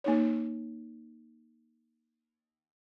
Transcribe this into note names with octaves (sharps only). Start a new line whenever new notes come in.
A#3 D#4 C#5